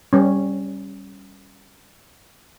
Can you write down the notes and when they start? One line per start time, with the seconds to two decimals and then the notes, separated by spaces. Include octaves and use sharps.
0.13 G3 C#4